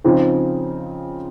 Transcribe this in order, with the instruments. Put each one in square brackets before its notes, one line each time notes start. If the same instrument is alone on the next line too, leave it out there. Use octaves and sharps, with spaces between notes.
[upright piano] C#3 F3 C4 D#4 G#4